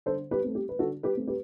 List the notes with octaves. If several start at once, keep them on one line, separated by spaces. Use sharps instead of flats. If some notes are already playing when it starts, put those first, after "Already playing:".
D3 A4 C5
G4 B4
A3 C4
G4
B4
D3 F#4 A4
G4 B4
A3 C4
G4 B4